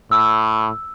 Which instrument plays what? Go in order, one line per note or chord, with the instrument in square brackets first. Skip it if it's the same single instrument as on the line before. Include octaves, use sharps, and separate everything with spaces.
[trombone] A2 [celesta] E6